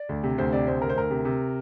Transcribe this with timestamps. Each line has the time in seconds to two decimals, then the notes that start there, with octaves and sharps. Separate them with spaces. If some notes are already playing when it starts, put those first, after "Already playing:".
Already playing: D5
0.09 D2
0.23 C3
0.38 D2 C5
0.52 C3 D5
0.67 D2 C5
0.82 D2 A#4
0.89 C5
0.96 D2 A#4
1.10 C3
1.25 C3